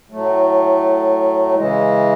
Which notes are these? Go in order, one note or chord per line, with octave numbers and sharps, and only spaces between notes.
A2 F#3 A3
C#3 E3 G#3